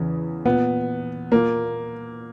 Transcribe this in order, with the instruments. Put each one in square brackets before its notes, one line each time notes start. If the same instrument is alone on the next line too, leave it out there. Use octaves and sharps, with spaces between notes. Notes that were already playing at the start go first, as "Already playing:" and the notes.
Already playing: [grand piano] E2 C#3 E3
A#2 B3
A#2 A#3